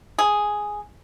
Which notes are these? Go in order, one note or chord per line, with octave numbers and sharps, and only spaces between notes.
G#4